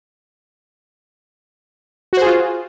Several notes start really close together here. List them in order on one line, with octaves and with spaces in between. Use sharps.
F#4 C5 G#4 F4